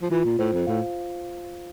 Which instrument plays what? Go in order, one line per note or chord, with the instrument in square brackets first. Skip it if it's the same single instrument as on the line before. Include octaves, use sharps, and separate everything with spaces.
[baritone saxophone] F3
[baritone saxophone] E3 [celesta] F4
[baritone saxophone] A#2
[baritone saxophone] A2 [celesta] C5
[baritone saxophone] F2
[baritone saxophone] A2 [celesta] F5